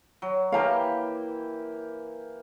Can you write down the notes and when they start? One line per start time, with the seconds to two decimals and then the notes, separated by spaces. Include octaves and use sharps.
0.22 F#3
0.52 E3 A#3 G4 F5 A#5